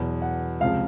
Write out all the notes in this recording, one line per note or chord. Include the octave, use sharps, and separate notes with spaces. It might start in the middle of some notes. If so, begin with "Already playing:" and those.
Already playing: E2 B2 F#3
F#5
C#2 C3 F3 F5